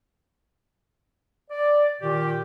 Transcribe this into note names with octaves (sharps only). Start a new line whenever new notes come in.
D5
A#2 D#3 G4